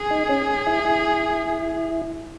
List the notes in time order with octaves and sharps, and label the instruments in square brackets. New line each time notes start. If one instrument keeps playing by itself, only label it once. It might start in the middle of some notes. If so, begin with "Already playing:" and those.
Already playing: [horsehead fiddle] G#4
[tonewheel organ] D#4
C#4
E4
E4